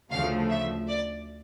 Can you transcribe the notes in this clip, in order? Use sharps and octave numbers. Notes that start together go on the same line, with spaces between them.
D2 C#3 F3 A3 F5
E5
D5